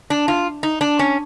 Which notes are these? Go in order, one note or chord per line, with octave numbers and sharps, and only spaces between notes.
D4
F4
D#4
D4
C#4